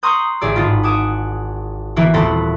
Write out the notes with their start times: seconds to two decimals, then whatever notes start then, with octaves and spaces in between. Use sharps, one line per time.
0.03 A#5 C6 C#6 D#6 F#6 G6
0.41 A1 G#4 D5 E6
0.55 G#1 D#4 F4 B5
0.83 F#5 G#5 D6 D#6 E7
1.96 E3 A#3 B3 E4 F#4
2.14 D#1 C4 A4 F#5 B5